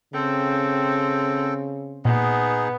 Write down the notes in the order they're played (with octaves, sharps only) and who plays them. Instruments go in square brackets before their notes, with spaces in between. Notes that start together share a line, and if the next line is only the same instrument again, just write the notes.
[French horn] C#3 [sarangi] C4 [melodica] A4 G5
[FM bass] A#2 [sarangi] B3 [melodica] D#4 G#4